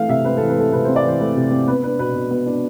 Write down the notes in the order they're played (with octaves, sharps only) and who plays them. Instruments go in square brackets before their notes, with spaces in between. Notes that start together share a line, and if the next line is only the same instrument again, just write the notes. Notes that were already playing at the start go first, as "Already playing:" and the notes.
Already playing: [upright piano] E3 A3 F5
C3 E5
C4 B4
A4
E3
B4
A3 A4
C3 B4
C5
C4
D5
E3 C5
A3 B4
C3
C4
B3 B4
D4 B4
B2 B4
B2
B3
D4